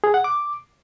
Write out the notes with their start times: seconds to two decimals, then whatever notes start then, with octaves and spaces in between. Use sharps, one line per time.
0.04 G#4
0.14 F#5
0.24 D6